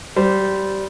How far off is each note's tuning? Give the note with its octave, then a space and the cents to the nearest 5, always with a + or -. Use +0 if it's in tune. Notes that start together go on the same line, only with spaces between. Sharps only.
G3 -20 C5 -20